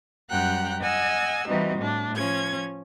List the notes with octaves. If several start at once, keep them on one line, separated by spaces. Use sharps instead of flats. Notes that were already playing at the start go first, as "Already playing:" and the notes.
F#2 G3 F#5 G5 A#5 F#6
D#5 F#5 G#5 E6
E3 G3 C4 D#4 F#4
A2 D4
F3 C#4 G#6